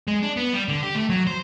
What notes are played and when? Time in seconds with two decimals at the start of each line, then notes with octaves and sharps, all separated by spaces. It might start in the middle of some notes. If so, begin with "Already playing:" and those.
0.07 G#3
0.22 D4
0.37 B3
0.53 G3
0.68 D3
0.83 G4
0.95 A3
1.10 F#3
1.27 C5